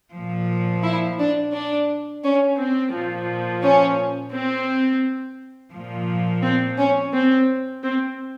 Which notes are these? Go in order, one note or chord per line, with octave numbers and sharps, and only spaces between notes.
A#2 F3
E4
D4
D4
C#4
C4
A#2 F3
C#4
C4
A#2 F3
C4
C#4
C4
C4